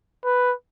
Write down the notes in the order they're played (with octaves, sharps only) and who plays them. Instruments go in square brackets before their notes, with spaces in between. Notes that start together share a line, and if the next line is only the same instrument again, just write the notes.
[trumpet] B4